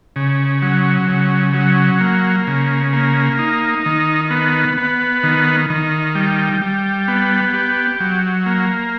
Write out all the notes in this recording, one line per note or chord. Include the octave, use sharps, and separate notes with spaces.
C#3
F#3
C#3
F#3
A#3
C#3
A#3
D#4
D#3
B3
B3
D#3
D#3
G3
G3
B3
G4
F#3
A#3